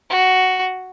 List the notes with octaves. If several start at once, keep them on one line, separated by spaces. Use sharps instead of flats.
F#4